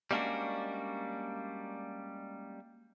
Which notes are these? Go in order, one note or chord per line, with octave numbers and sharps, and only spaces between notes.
G3 G#3 A#3 C#4 D4 F#4